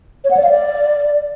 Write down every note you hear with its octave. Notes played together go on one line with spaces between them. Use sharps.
C#5
F#5
D5
F5
D5